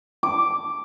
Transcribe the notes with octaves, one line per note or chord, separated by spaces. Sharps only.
D6